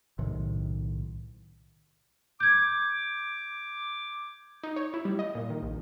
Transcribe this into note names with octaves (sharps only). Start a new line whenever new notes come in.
B1 A2 C3 D#3
D6 G6 G#6
D#4
C#5
E4
G3
D#5
A#2
D#3
A#1